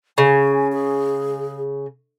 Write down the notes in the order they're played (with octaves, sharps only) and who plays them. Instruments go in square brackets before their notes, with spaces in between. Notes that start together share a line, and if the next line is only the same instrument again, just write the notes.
[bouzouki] C#3 [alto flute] G#5
[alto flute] G#4